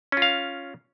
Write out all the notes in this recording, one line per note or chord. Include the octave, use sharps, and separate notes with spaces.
C#4 F4 F5